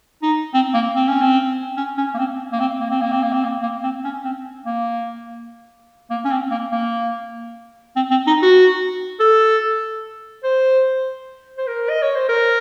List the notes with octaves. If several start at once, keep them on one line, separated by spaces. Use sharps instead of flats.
D#4
C4
A#3
C4
C#4
C4
C#4
C#4
A#3
C4
A#3
C4
A#3
C4
A#3
C4
A#3
C4
A#3
A#3
C4
C#4
C4
A#3
A#3
C#4
C4
A#3
A#3
C4
C4
D#4
F#4
A4
C5
C5
A#4
D#5
C#5
C5
A#4